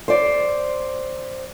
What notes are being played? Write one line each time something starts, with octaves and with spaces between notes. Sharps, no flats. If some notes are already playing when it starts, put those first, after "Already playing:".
C5 D5